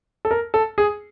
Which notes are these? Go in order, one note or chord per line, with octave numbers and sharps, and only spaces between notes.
A4
A#4
A4
G#4